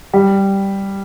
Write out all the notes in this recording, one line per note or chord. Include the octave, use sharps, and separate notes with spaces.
G3